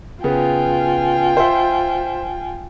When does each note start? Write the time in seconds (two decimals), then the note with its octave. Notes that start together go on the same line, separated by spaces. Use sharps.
0.24 C#3 B3 F4 G5 G#5
1.37 C5 E5